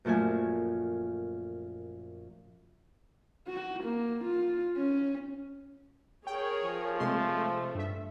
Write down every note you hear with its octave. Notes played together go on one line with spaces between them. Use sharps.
F#2 A#2 F3 A3 G#5
F#4
A#3
F4
C#4
G#4 A#4 C#5 G5
F3
C3 G#3 A3 C6
G2 E5